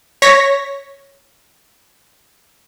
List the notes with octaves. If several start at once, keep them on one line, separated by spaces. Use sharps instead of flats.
C#5 C#6 A#6 B6